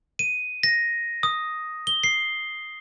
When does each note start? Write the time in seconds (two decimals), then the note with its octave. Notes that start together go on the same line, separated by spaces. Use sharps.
0.19 D#7
0.63 A#6
1.23 D#6
1.87 G7
2.04 C7